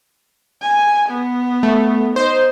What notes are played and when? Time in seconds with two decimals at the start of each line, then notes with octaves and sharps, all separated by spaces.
0.62 G#5
1.10 B3
1.63 A3
2.16 D#4 C5